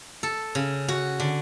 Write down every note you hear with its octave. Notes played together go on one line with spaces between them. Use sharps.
A4
C#3
F#4
D3